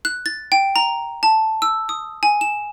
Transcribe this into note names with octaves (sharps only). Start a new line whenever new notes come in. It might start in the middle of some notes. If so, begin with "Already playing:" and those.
F#6
A6
G5
A#5
A5
E6
D#6
G#5
E7